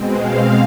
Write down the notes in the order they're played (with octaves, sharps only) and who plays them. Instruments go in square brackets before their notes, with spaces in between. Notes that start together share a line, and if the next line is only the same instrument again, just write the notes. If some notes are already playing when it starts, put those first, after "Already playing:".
Already playing: [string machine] B2 G#3 C4
F5